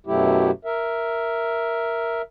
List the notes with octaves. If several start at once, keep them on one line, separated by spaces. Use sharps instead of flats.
F#2 B2 F#3 A3 E4 G4
A#4 E5